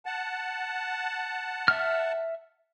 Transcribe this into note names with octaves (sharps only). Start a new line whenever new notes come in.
F#5 A5
E5 F6